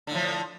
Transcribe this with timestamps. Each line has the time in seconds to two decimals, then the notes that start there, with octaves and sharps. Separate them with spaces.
0.07 D3
0.11 A2
0.15 F3